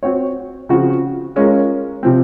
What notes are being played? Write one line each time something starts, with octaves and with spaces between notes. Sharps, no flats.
C4 F#4 C#5
C#3 F3 C4 F#4
G#3 C#4 F4 A#4
C3 F3 C4